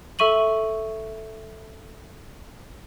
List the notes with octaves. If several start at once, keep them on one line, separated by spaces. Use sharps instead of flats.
A4 E5 C#6 D#7 F#7